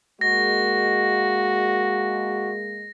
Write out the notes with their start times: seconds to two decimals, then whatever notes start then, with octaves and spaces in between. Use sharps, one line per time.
0.21 G#3 A#3 F#4 A#6